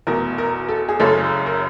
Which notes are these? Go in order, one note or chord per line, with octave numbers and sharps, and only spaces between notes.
F1 E2 B2 A#4
A#4
A4
G#4
F#1 F#2 C#3 A4
A#4